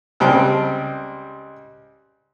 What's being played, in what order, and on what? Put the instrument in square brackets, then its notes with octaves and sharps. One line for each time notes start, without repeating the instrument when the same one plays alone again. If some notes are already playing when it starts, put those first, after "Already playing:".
[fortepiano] C#2 G3 C4 G5 A5